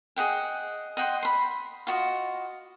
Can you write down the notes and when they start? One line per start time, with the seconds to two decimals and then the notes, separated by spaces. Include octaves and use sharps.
0.16 G#4 D#5 F#5 G5
0.97 D#5 F#5 G5 C6
1.23 B5 C6
1.87 F4 F#4 D#5